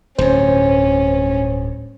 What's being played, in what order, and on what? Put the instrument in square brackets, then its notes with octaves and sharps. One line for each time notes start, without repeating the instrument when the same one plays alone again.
[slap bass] D1 G2 [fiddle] C#4 [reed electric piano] C5